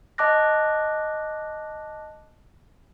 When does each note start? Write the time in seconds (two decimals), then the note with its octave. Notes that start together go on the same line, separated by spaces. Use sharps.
0.18 D#5 A5 D6 F#6 A#6